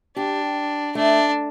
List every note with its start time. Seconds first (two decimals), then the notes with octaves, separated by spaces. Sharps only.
0.16 D4 G4
0.95 A3 D4